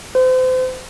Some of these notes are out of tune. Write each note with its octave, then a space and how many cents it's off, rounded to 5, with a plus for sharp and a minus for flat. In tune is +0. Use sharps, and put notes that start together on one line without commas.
C5 -35